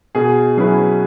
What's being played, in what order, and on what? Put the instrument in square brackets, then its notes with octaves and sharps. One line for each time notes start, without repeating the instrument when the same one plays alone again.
[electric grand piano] B2 [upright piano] G#4
[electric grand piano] F#3 C#4 E4 B4 [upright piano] G#4